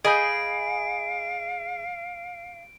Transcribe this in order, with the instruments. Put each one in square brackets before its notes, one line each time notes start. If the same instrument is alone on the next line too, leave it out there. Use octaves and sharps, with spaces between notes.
[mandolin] G#4 [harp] D#5 B5 G6 [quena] F5 [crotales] D7